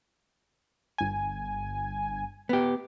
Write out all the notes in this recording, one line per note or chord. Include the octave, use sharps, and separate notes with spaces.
G1 G#5
B3 G4